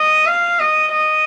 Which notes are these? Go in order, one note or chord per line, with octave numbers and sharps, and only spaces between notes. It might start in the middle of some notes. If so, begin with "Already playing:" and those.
Already playing: D#5
F5
D#5
D#5